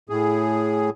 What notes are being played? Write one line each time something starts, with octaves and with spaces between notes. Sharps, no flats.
A2 G#4